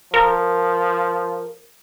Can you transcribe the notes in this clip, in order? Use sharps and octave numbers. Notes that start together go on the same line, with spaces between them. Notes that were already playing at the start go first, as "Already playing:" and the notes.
F3 A#4